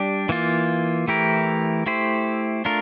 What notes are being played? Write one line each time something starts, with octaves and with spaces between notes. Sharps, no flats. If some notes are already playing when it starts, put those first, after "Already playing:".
Already playing: G3 D4 G4
E3 A#3 F4
E3 A3 E4 G4 A#4
A3 E4 G4 C5
A3 D4 F4 A#4